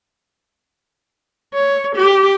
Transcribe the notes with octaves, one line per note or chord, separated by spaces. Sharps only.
C#5
G4